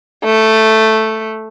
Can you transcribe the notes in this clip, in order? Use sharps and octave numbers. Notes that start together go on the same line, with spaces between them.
A3